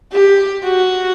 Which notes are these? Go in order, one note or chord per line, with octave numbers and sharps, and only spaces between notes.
G4
F#4